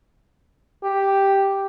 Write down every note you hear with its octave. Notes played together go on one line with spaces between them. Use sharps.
G4